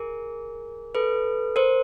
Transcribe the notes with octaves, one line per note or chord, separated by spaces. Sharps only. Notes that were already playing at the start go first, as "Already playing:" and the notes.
Already playing: G#4 A#4
A4 B4
A#4 C5